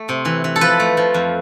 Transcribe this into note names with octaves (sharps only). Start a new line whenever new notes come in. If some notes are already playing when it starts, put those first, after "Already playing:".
Already playing: A3
C3
E3
E3
A4
F3 B4
A3
F3
F2